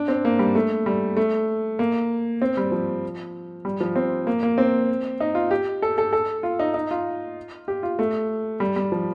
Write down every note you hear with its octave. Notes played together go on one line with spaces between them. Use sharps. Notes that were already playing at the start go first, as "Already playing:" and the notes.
Already playing: D4
C4
A#3
G3
A3
G3
A3
A#3
C4
G3
F3
G3
F3
C4
A#3
A#3
C4
D#4
F4
G4
A4
A4
A4
F4
D#4
D#4
F4
G4
F4
A3
G3
G3
F3